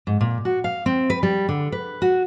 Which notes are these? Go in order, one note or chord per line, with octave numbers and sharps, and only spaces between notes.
G#2
A#2
F#4
F5
C4
B4
G3
D3
B4
F#4